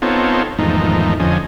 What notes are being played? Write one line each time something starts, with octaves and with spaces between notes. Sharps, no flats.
B3 C4 D#4 F4 A4 C#5
E2 G#2 D#3 F3 A3 D#4
F2 D3 F3 C#4 D#5 G#5